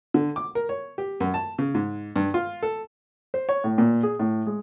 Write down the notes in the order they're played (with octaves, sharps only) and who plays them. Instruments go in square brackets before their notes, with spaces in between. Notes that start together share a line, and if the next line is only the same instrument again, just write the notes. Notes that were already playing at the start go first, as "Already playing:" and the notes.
[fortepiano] D3
D6
A#4
C#5
G4
F#2
A5
C#3
G#2
G2
F4
A4
C5
C#5
A2
A#2
G#4
A2
G#3